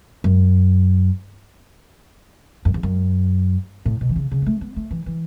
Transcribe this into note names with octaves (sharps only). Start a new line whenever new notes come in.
F#2
F#2
E2
F#2
A2
B2
E3
C#3
C#3
B3
A3
B3
A3
E3
E3